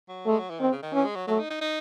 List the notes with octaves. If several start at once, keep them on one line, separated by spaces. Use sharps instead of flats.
F#3
G#3 A3
F#3
E3
D#3 C4
C#3
D#3
E3 C#4
G#3
F#3
F#3 A3
D#4
D#4
D#4